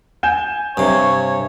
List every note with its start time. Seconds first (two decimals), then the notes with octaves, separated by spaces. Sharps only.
0.23 G#5 G6 E7
0.77 G2 C3 C#5